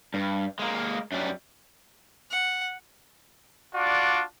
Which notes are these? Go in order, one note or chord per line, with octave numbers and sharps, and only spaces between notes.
G2
G#3 A#3
F#2 G3
F#5
D4 F4 F#4 D5